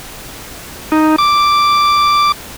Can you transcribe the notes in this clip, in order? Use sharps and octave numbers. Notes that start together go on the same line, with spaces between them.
D#4
D6